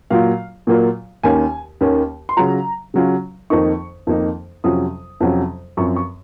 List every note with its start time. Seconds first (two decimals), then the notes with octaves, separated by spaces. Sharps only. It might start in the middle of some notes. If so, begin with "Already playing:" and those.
0.10 A#2 F#3 A#3 F4 F5
0.67 A#2 F#3 A#3 F4
1.23 D#2 D#3 A#3 C#4 G#5
1.81 D#2 D#3 A#3 C#4
2.29 C6
2.37 C#3 F#3 C#4 F4 A#5
2.94 C#3 F#3 C#4 F4
3.50 F2 D#3 A#3 D#4 C#6
4.07 F2 D#3 A#3 D#4
4.64 F2 C3 F#3 C#4 F4 D#6
5.20 F2 C3 F#3 C#4 F4
5.77 F#2 F3 C4 C#6
5.96 C#6